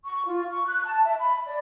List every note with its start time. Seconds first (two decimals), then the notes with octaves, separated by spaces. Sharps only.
0.05 C#6
0.26 F4
0.51 C#6
0.67 F#6
0.85 A5
1.05 E5
1.19 B5
1.46 D5